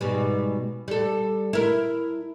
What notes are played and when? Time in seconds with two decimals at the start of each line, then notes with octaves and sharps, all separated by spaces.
0.01 G#2 B2 G3
0.88 G3 A4
1.53 E4 A#4